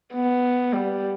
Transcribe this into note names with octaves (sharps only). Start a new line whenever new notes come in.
B3
G3